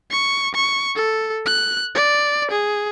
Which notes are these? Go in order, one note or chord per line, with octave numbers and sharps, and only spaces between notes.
C#6
C#6
A4
F#6
D5
G#4